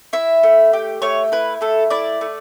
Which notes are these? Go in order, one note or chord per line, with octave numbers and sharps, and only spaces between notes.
E4 E5
A3
G4
A3 C#5
E4 B4
A3 A4
E4 D5
A3